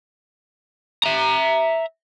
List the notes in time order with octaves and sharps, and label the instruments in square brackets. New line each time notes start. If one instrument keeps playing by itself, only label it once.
[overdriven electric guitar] E5 A#5